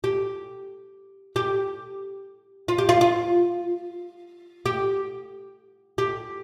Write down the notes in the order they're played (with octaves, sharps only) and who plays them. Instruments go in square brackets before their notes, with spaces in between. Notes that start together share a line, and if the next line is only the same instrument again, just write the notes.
[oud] G4
G4
F4
G4
F4
F4
G4
G4